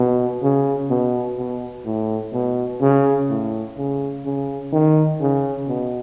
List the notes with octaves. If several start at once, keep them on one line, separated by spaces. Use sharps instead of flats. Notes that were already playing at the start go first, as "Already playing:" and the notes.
Already playing: B2
C#3
B2
B2
A2
B2
C#3
A2
C#3
C#3
D#3
C#3
B2